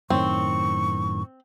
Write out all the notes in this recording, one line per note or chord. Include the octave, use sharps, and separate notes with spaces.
F#2 A2 D#3 C4 C#6